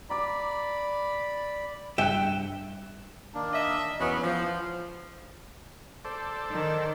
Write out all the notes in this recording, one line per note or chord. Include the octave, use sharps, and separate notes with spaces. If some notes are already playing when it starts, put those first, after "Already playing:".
D5 A#5 B5 D6
G2 E5 G5 F#6
D#3 A#3 D4
D#5 E5
E2 F#3 B3 C#4
E3 F3
A4 C5 D5
D#3